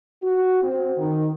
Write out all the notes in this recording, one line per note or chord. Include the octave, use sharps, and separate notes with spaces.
F#4
C4
D#3